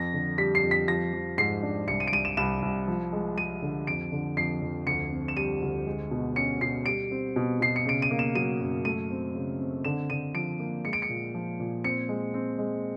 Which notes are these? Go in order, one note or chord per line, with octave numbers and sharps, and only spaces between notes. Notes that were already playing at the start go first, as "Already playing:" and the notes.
Already playing: F2 A#6
D3
G3 B6
C7
F2
B6
F3 A#6
F3
G#2 C7
D4
C2 C#7
D#7
D7
C2 D#7
E7
C2 E7
C2
F3
G#3
G#3 D#7
D3
F2 D7
D3
F2 C7
F2
D2 C#7
C4
E7
G3 D#7
D2
G#3
B2
C#4 C#7
B2 C7
G3 D7
C4
B2
B2 C7
C#7
C#3 D7
D#7
A#3
E7
F#3 D#7
F#2
A3 D#7
C4
C#3
C4
D3 E7
D3 D#7
F3 D7
A#3
G#3 C#7
D7
C#7
A#2
F3
A#2
C4 C#7
G#3
C4
G#3